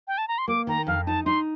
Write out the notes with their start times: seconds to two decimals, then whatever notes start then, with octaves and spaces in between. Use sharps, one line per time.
0.08 G5
0.18 A5
0.28 A#5
0.38 C6
0.48 A#3 D6
0.67 D#3 A#5
0.87 F2 F5
1.06 D#4 A5
1.26 D#4 C6